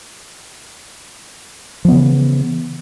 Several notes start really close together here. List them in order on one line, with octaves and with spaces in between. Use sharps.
F3 B3 C#3 E3